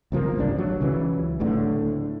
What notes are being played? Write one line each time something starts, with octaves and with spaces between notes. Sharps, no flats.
C#2 C3 F3 A#3
G#1 C#2 G2 D4
F#3
C#2 C#3 E3
D1 D2 A2 D3